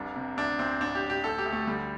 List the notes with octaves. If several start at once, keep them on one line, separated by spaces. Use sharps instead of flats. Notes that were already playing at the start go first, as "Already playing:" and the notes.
Already playing: F1 C2 D4
C3
D2 D4
D2 C4
A1 D4
G4
A1
G4
D2 A4
G4
D2
A3
D3 G3